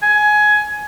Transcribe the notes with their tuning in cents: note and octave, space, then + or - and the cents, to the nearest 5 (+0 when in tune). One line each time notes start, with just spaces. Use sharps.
G#5 +20